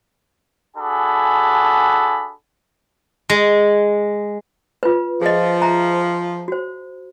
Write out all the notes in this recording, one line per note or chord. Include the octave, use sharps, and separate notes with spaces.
D4 F#4 G#4 A4 G#5 B5
G#3
F4 B4
F3 G#4 D#5
E5 A#5
F#4 C5